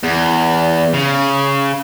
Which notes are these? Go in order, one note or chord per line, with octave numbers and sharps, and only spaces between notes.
E2
C#3